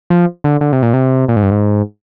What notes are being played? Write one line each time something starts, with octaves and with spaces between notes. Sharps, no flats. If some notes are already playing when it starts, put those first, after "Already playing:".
F3
D3
D3
C3
A#2
C3
A#2
G#2
G2
G#2